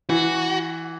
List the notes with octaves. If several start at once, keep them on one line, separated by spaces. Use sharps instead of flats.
E3 F#4